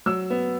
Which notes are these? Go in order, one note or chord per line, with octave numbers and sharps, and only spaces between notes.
F#3 E6
B3